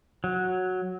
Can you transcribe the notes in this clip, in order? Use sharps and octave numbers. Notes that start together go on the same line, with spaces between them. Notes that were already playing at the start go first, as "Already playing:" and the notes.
F#3